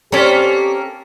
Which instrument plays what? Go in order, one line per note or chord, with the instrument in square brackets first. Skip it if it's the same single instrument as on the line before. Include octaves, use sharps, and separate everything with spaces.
[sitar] A#3 C#4 A4 [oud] C4 C#5 [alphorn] G4